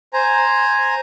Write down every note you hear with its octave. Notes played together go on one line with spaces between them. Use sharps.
C5 G#5 A#5